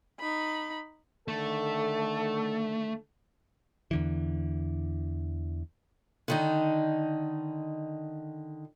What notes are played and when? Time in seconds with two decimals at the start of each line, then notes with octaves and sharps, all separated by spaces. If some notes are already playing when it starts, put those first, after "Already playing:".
0.20 D#4 B5
1.28 D3 D#3 A3 A4
3.91 E2 D3 E3
6.28 D3 D#3 D#4